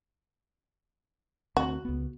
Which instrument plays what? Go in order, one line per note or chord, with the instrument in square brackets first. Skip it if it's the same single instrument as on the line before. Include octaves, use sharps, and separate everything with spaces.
[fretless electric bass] D2 C4 [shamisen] F#4
[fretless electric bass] C#2 B3